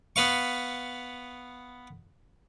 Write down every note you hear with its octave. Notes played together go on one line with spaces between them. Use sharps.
B3 B4 F5 C#6